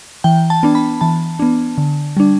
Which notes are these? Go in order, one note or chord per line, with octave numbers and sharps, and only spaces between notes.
E3 G5
A5
B3 D4
B5
E3 A5
B3 D4
D3
G3 D4